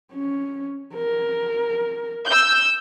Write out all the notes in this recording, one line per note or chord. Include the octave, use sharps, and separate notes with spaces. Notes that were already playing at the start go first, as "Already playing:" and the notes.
C#4
A#4
E6 G6